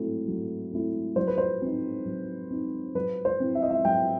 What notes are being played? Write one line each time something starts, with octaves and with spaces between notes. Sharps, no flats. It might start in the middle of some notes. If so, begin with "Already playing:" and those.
Already playing: F#3 A3 C4 E4
F#3
A3 C4 E4
F#3 C5
B4
C5
C4 D#4
F#3
C4 D#4
F#3 B4
C5
C4 E4
E5
D#5
E5
F#3 G5